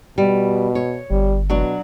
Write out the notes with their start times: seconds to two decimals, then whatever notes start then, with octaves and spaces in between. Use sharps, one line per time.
0.18 B2 G3
0.75 C#5
1.11 G1 G3
1.50 B2 F#3 D4 F#4